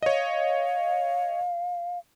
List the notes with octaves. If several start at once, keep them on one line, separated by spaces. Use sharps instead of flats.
C#5 D#5 F5